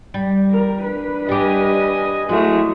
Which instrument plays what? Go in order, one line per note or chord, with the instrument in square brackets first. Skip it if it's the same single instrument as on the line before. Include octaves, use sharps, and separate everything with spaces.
[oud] G3
[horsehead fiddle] A#4
D4 B4
[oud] G3 G4 [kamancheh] D#5 G#5
[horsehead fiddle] F#3 E4 [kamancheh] G#3 A3 [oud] F#4